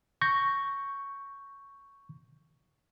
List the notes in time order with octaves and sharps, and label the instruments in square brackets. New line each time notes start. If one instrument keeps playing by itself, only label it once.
[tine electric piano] C#6 G6 A#6